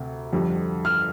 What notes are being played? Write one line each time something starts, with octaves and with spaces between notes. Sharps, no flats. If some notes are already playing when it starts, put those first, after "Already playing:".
Already playing: D2 C3
F2 D3 G3
F6